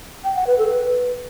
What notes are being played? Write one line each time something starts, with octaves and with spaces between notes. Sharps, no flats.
G5
F#5
B4
A4
B4